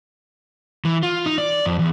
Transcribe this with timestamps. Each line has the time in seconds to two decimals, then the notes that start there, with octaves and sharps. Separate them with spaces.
0.85 E3
1.03 F4
1.26 D#4
1.38 D5
1.66 F2
1.79 E2